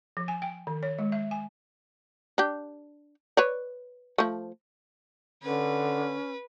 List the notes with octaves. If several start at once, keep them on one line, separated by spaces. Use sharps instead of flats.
F3
G#5
G5
D#3
C#5
G#3
E5
G#5
D4 G4
B4 C#5 D5
F3 A3
D3 C#4 B4